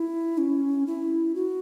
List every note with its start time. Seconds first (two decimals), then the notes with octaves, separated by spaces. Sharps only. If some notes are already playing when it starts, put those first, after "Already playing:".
Already playing: E4
0.38 C#4
0.87 E4
1.35 F#4